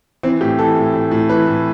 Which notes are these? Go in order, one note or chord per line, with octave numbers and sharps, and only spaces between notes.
E3 C4
A2 G4
E3 A4
A2
A2
A2
E3 B4
A2